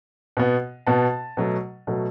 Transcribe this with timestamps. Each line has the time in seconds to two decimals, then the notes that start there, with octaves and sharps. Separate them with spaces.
0.37 B2 B3
0.87 B2 B3 A5
1.37 B2 F#3 A3
1.87 B2 F#3 A3